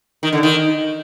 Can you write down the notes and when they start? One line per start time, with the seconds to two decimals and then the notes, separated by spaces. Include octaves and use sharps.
0.23 D#3
0.33 D3
0.43 D#3